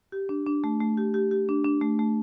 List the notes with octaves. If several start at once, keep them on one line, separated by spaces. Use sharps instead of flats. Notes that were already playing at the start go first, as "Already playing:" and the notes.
G4
D4
D4
A3
A3
G4
G4
G4
D4
D4
A3
A3